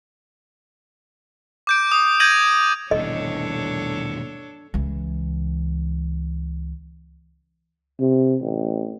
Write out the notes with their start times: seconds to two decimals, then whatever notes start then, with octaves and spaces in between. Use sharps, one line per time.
1.67 D6 G6 D7
1.92 D#6
2.20 G6 G#6 A#6 D#7 F#7
2.91 D#1 G2 B2 E3 D4 A4 C#5 D#5
4.74 C#2 E3
8.00 C3
8.42 A1